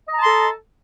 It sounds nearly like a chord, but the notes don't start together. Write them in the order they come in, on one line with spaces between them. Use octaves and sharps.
D#5 A#5 A5 C6 A4